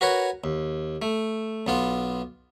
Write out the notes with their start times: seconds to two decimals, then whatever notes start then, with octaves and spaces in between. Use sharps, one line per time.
0.01 F#4 A#4 B4 C#5
0.44 D#2
1.02 A3
1.67 B1 B3 F4